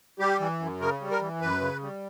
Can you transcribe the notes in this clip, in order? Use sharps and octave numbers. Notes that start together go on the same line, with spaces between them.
G3 G4
E3
F#2
C#3 A#4
G3
A#4
E3
F#2 B4
C#3
G3